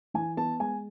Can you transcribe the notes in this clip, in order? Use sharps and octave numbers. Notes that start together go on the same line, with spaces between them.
E3 G#5
B3 A5
G#3 G#5